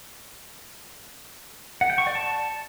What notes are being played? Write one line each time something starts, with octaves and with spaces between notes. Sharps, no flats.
F#5
G5
C#6
D5
A5